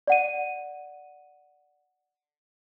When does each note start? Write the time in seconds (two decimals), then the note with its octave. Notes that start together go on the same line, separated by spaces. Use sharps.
0.07 D5 F#5 D#7